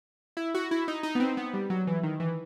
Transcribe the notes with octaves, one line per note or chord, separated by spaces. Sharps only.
E4
F#4
E4
D#4
D#4
B3
C4
B3
G3
F#3
E3
D#3
E3